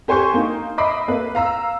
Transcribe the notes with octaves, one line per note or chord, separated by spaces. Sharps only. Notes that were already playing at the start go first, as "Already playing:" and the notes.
G4 C5 G#5 C6 C#6 G6
A#3 D#4
D#5 E5 B5 D6 C7
A#3 B4
F5 A#5 E6